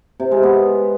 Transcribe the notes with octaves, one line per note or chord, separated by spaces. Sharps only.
C3
G#3
B3